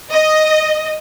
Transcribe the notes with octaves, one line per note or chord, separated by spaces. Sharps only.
D#5